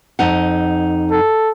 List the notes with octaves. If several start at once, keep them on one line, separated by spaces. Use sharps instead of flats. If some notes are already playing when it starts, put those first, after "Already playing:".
F2 D#4 F#5
A4